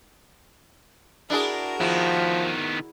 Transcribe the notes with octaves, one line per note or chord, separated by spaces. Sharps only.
D4 E4 F#4 G#4 A#4
D#3 F3 B3 E4